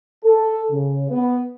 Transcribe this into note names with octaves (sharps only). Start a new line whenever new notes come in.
A4
C#3
B3